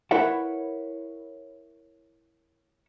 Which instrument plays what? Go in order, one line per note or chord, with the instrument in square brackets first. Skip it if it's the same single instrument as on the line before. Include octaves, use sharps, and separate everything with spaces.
[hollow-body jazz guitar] E4 A#4 B4 C#5 E5 F#5